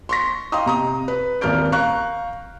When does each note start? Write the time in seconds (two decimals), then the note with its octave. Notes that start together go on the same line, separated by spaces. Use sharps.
0.09 C6 C#6 A#6
0.52 D#5 F5 G5 A#5 C6 D#6
0.66 C3 A#5 D#6
1.08 B4
1.41 D#1 G#1 A#4 F6 G6 D7
1.72 F5 A#5 C#6 F#6